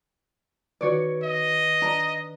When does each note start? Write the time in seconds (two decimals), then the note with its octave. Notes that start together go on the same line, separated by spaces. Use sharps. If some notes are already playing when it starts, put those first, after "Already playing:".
0.81 D#3 F#4 B4 C#5 D5
1.23 D#5
1.82 D4 A#5